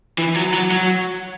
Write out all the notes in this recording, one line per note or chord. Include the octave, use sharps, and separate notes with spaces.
E3
F#3
F#3
F#3